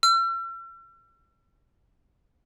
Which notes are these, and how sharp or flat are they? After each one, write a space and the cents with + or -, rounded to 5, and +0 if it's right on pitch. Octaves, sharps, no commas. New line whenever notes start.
E6 +45